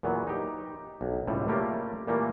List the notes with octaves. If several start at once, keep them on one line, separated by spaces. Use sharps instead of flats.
E2 A#2 F#3 B3
D#4 G4
B1
C#2 A2 C3 G3
G3 A3 A#3 F4 G4
A#2 E3 G3 A3 A#3